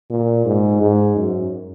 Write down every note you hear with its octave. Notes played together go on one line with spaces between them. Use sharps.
A#2
G#2
G#2
F#2